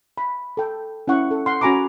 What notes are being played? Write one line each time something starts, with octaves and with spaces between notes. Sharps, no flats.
B5
A4 G5
C#4 E4 F#5 C#6
A4
F#5 C6
C#4 F#4 G#5 A#5 B5 D6